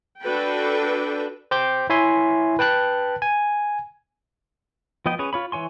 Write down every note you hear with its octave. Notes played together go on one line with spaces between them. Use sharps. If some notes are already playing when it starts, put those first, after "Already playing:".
D4 F#4 A4 B4 G5
C5 G5 D6 G6
E4 C#5 E5 G#5 C6
B4 G5 A5 F#6
G#5
F3 B3 D#5 G5
C#4 G#4 B4 C#5
F4 C#5 B5
E3 C#5 G#5 C6